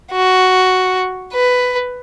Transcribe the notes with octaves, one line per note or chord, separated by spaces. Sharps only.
F#4
B4